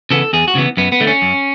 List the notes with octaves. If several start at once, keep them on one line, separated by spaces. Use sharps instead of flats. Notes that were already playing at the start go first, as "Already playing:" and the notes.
C#3 E3 B3 A4
E2 G#4
F#4
C#3 E3 B3
F#2 B3
B3
D3 A3
C#4
F#2